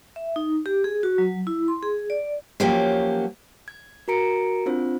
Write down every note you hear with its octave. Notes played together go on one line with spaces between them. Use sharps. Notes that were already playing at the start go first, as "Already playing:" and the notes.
E5
D#4
G4
G#4
F#4
F#3
E4
C6
G#4
D5
F3 F#3 A#3 C#4 G4
G#6
F#4 A#4 A#5 C#7 D7
C4 D4 F4 C5